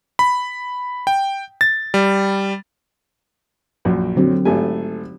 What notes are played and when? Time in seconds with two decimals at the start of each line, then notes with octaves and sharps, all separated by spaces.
0.19 B5
1.07 G5
1.61 A6
1.94 G3
3.85 A#1 F#2 F#4
4.16 D3 F#3 C4
4.45 G#1 A3 G4 G#5